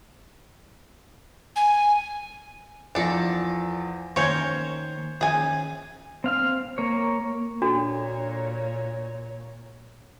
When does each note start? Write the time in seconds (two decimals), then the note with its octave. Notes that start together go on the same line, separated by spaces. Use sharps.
1.56 G#5
2.95 E2 F3 D4 A4 A#6
4.16 D#3 A#3 C#4 A#4 C5 C#5 G6 G#6
5.21 D#3 C#4 G#4 G#5
6.24 C4 F5 F6
6.78 A#3 C#5
7.62 A#2 D4 F#4 A4 C#5